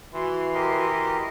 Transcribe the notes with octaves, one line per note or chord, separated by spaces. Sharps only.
E3 F#4 C6
G4 A#4 D#5